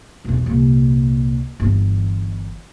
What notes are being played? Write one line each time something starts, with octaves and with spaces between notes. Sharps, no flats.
B1 E2
C2 A#2
G1 E3